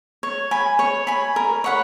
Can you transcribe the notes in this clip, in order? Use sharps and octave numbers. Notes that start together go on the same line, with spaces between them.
C#5
G#5 B5
C#5
G#5 B5
A#4
C#5 F#5 B5